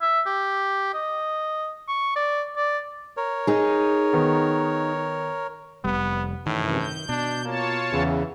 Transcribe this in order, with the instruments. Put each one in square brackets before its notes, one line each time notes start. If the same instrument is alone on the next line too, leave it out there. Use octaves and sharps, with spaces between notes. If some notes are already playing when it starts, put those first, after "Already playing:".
[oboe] E5
G4
D#5
C#6
D5
D5
[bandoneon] A#4 C#5
[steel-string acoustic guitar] D#4 G#4
[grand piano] D#3 B3
[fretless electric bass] F1 G3 [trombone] B3
[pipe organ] F#2 C3 E3 [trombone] A2 [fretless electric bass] D#3
[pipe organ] G6
[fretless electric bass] B2 [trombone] D4
[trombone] A#3 [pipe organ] F4 C#5 A5
[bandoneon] E2 C#3 [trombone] E3